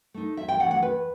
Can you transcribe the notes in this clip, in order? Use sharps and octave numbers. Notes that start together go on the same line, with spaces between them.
A3 D#4
E2 E5
G5
C3 E3 A3 F#5
F#5
E2 B4